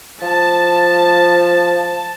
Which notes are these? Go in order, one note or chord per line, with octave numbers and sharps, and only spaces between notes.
F3 A5